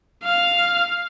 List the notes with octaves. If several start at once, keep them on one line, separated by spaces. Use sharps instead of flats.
F5